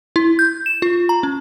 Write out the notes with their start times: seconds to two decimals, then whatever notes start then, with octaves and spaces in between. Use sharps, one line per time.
0.16 E4
0.39 G6
0.66 E7
0.82 F4
1.09 A#5
1.23 C#4